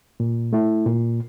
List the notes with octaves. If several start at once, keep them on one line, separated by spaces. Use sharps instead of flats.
A#2
A3 E4
A#2